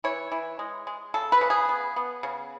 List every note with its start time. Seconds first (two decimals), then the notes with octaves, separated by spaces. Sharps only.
0.04 E3 C#5
0.32 E3
0.59 G#3
0.87 G#3
1.14 C#3 A4
1.32 B4
1.41 C#3
1.50 G#4
1.69 B3
1.96 B3
2.23 C#3